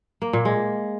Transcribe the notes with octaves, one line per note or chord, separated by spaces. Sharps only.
A#3
A#2
G#3